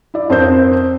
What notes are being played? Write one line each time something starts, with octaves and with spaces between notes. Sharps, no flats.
E4 D5
F2 C4 A#4 C5 G6